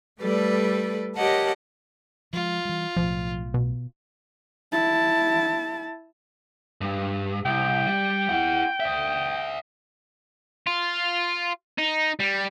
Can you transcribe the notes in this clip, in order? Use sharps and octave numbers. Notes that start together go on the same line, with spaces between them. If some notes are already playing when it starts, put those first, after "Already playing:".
G3 A3 A4 B4 D5
G4 A#4 C#5 D#5 F#5 A5
F3 G#3 F4
E3 G3
B1 A2 F3
B2
E4 A5
G2
C2 G5
G3
E4 F#5
D5 E5
F4
D#4
G3